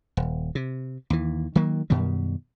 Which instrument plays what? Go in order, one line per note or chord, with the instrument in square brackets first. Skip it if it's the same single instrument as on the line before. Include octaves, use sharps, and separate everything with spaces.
[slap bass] D#1
C3
D#2 E3
D#3 F#3 A#3
F#2 B2 D#3 G3